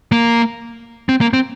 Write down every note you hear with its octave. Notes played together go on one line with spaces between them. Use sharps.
A#3
C4
A#3
C4